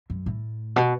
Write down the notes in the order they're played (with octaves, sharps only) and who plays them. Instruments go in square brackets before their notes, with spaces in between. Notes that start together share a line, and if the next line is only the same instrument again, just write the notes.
[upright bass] F#2
A2
B2